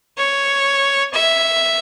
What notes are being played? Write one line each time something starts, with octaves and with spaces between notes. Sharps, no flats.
C#5
E5